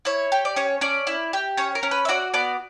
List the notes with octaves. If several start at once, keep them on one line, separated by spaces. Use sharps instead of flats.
E4 C#5
G4
D5
C#4 C#5
C#4 D5
E4
G4
C#4 C#5
A#4
C#4
B4
E5
F#4 D5
B3 D5